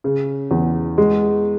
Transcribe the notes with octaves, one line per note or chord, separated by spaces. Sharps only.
C#3
E2
G#3